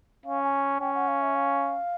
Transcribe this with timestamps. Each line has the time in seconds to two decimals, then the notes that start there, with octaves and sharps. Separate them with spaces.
0.25 C#4 F5
0.43 G#5
0.80 C#4 G5
0.95 F#5
1.08 F5
1.22 E5
1.35 F5